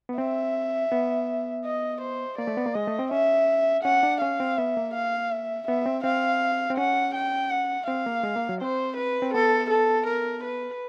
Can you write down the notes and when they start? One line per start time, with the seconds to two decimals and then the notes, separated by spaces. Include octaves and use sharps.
0.09 B3
0.18 C4 E5
0.92 B3
1.64 D#5
2.01 C5
2.38 A#3 D5
2.47 A3
2.57 B3
2.66 A#3
2.74 G#3 D#5
2.87 A3
2.99 C4
3.11 C#4 E5
3.84 C#4 F#5
4.03 D4
4.21 C#4 F5
4.40 C4
4.57 B3 E5
4.77 A#3
4.95 F5
5.31 E5
5.68 B3 E5
5.86 C4
6.04 C4 F5
6.70 C4
6.77 C#4 F#5
7.15 G5
7.51 F#5
7.88 C4 F5
8.06 A#3
8.23 G#3
8.36 A#3
8.49 F#3
8.61 C4 C5
8.97 B4
9.22 C4
9.34 B3 A4
9.70 A4
10.06 A#4
10.44 B4